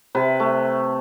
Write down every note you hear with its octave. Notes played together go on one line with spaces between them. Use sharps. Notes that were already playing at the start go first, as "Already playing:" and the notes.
C3 B4
A3